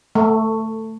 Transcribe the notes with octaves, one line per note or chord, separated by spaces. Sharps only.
A3